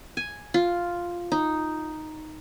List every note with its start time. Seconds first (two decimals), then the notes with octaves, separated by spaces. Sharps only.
0.17 G#5
0.54 F4
1.32 D#4